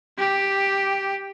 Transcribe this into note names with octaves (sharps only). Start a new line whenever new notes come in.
G4